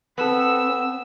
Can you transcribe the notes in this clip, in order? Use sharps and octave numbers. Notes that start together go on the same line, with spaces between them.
B3 C4 A4 F#5 E6